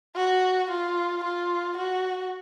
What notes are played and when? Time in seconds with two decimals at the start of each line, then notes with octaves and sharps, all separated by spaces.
0.15 F#4
0.70 F4
1.23 F4
1.76 F#4